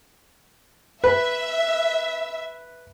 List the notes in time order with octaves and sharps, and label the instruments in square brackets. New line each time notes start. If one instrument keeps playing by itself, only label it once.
[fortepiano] B4 [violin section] E5